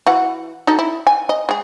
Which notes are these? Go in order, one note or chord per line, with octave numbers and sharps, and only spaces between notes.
E3 F#4 F#5
D#4 F#4 A4
E4
G#5
D#5
G#3 G#4